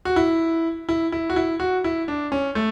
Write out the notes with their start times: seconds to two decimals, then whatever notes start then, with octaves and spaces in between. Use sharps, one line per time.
0.05 F#4
0.16 E4
0.89 E4
1.12 E4
1.30 F#4
1.36 E4
1.60 F#4
1.84 E4
2.08 D4
2.32 C#4
2.55 A3